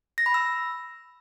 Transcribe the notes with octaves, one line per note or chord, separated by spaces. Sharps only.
A#6
B5
E6